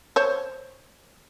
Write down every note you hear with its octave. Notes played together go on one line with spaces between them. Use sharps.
C5 C#5